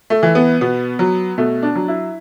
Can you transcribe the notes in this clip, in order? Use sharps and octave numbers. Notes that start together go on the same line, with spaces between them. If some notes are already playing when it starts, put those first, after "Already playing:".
A3
E3
B3
B2 B3
F#3
B2 A3
D4
F#3
E4